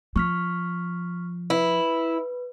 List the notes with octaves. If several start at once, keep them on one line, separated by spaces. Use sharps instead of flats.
F3 C#6 F6 B6
E4 B4